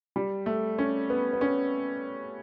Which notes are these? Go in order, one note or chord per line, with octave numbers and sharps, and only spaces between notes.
G3
A3
C#4
B3
B3
C#4